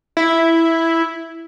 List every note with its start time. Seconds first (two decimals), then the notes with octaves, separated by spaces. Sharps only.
0.17 E4